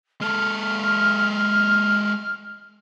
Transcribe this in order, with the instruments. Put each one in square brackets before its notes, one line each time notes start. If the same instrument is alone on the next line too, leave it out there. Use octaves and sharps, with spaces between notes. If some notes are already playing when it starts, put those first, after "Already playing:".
[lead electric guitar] G#3 A4 [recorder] F6